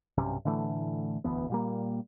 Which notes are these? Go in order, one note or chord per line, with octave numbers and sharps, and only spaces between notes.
B1 G2 C3 C#4
A2 D3 E3 A3
E1 D2 E3 B3
A#2 G3 A#3